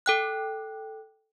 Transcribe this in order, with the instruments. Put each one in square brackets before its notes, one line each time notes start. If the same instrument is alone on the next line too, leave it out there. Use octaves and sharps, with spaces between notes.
[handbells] A4 G5 F#6